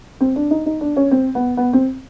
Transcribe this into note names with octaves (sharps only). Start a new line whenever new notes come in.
C4
D4
D#4
D#4
D4
C#4
C4
B3
B3
C4